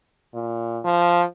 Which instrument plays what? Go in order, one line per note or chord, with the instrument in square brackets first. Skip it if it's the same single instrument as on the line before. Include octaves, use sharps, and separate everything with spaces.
[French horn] A#2
F3